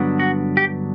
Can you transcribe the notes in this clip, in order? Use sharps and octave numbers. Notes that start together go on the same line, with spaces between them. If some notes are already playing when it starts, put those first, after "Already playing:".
Already playing: G2 D3 F#3 B3 D4
F#4
G4